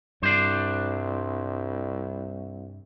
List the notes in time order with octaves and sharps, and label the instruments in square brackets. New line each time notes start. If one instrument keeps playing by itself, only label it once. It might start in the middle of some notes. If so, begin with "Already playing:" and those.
[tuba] C2 [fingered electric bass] G2 [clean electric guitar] D4 C5